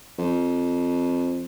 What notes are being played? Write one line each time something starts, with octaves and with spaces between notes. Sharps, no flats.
F2